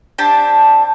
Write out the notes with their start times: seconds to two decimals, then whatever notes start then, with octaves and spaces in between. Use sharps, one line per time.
0.18 C4 D4 G4 A5